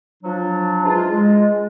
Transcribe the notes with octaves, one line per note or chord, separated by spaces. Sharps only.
F3 F#3 D4
E3 G#3 D4 F4
G#3